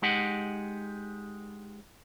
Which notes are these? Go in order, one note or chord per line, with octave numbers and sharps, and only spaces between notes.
G#3 D#4 G4 D#5 F#5